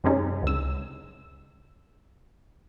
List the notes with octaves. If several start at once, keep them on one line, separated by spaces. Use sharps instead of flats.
F#2 C3 G#3 C#4 D#4
C#2 E6